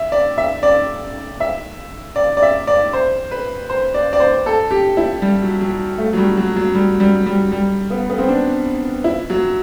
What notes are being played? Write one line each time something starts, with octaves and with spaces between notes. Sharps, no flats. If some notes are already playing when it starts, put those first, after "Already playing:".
Already playing: E5
D5
E5
D5
E5
D5
D5
E5
D5
C5
B4
C5
D5
D5
C5
A4
G4
E4
G3
F#3
F#3
A3
F#3
G3
F#3
F#3
G3
G3
G3
G3
B3
B3
C4
D4
E4
F#3